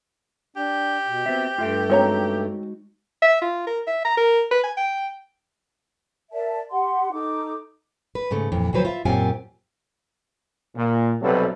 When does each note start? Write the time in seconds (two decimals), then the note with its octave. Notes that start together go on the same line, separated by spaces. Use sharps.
0.56 D4 G4
1.07 B2
1.26 B3 C4 F#4 E5
1.58 G2 A3 F4 E5 G5
1.90 G#3 C4 D#4 F#4 C#5 A#5
3.22 E5
3.42 F4
3.67 A#4
3.87 E5
4.05 A#5
4.17 A#4
4.51 B4
4.64 G#5
4.77 G5
6.32 A#4 D5 E5 A5
6.71 G4 F#5 C6
7.12 D#4 A4 D6
8.15 B4
8.31 G#2 C#3 A3
8.52 F2 A#2 E3
8.73 D2 F3 F#3 B4 C5
8.85 F4 E5
9.05 F#2 A#2 C4 F4 G4 G#5
10.76 A#2
11.21 B1 C3 F#3 G3 A4 B4